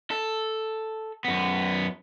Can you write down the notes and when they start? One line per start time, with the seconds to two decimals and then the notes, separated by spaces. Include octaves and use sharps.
0.11 A4
1.25 F#2 B3